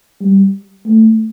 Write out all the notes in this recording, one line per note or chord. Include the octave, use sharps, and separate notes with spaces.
G3
A3